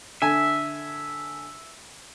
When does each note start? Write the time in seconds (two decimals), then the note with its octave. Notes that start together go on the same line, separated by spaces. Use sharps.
0.22 D3 E5 G#5